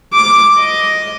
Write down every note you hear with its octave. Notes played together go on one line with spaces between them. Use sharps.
D6
D#5